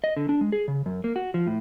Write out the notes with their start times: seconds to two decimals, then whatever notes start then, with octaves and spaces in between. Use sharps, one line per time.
0.04 D#5
0.17 D3
0.29 D4
0.41 G#3
0.52 G#4
0.68 C#3
0.86 F#2
1.04 A#3
1.16 F#4
1.34 F3
1.47 A2